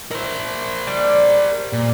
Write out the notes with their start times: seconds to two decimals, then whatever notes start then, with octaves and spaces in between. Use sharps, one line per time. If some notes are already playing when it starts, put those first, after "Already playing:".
0.11 E4 A#4 C5
0.87 G3
1.73 A#2